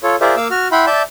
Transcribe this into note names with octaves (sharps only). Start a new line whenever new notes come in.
F4 A4 C#5
F4 G#4 A#4 C5 D5 E5
A#3 F5 D6 E6
F#4 F6
E4 E5 F#5 G5 B5 C6
D5 E5 A5 G6